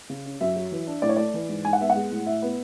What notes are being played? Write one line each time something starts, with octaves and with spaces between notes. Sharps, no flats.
C#3
C#4
F#2 E5
F#3
E3
D4
A2 D5
C#5
A3 D5
E3
G#2
G#2 G#5
F#5
B3 E5
F#5
G#3
A2
A2 E5
B3